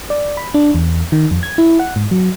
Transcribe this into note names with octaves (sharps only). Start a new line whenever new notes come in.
D5
B5
D4
E2
D#3
F2
G#6
E4
F#5
G#2
F#3